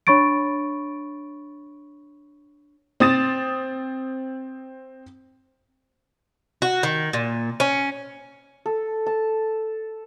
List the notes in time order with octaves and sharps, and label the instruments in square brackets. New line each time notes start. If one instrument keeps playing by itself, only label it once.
[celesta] D4 C#5 B5 C#6 A6 D7
[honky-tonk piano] C4 D#6 A6 E7
[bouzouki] F#4
D#3
A#2
C#4
[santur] A4
A5